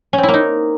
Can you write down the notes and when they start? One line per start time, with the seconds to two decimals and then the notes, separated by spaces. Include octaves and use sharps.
0.13 C#4
0.18 C4
0.23 E4
0.28 A#3
0.34 D#4